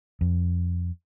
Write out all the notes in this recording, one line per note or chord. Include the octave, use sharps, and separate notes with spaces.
F2